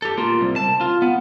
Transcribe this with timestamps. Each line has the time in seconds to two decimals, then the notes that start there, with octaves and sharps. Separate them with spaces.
0.02 G4 A4
0.18 A#3 F4
0.41 C2
0.56 A5
0.81 F4
1.02 B3